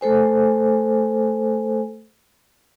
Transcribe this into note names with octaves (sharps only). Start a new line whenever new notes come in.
A3 A4 C5 G#5